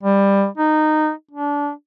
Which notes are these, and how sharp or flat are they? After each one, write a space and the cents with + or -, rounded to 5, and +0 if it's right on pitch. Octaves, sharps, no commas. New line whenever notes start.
G3 +15
D#4 -15
D4 -25